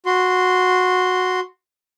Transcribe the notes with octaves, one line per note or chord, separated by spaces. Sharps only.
F#4 C6